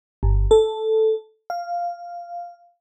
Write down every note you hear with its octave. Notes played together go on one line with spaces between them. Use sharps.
G1
A4
F5